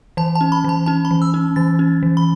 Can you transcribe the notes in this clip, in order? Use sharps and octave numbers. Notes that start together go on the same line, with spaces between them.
E3 A5
A5
C#4
B5
E3 A5
C#4 A5
B5
E3
E6
C#4
E3 A6
C#4
E3
B5